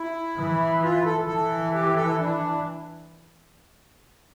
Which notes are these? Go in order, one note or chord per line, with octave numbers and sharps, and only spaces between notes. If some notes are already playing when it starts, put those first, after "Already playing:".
Already playing: E4
E3
F4
A4
E3 A4
G4
A4
D4